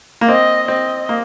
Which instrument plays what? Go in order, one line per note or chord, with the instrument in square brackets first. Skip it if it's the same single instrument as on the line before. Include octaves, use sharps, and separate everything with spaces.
[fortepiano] A#3
[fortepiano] C4 [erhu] D#5
[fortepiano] C4 [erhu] D#5
[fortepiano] A#3